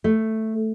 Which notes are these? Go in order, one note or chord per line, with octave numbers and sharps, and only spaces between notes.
A3